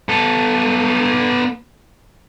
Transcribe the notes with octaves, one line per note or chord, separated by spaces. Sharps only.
B3 A4